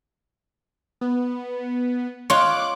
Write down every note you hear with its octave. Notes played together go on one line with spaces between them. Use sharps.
B3
F4 C#5 D6 F#6